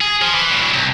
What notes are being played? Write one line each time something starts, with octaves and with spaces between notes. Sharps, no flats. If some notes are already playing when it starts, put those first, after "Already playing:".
G#4
F3
E3
A2 F#3
C2